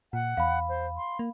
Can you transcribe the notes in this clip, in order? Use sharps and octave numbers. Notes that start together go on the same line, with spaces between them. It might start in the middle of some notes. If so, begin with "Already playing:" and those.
A#2 F#5
E2 F5 B5
C5
C6
A#3